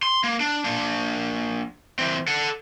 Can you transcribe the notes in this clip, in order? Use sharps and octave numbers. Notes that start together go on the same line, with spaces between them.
C6
A#3
D4
A#3 D4
E3 C4
A4 F#5